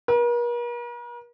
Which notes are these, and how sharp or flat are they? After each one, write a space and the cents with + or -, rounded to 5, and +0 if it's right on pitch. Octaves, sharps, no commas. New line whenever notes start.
A#4 +45